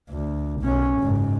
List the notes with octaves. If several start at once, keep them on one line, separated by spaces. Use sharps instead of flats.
D2
B1 C#4
F#1 G#2